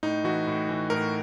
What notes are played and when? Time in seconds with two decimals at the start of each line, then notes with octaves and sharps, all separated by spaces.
0.03 A2 D#4
0.24 E3 F#4
0.47 A2
0.69 E3
0.90 A2 A#4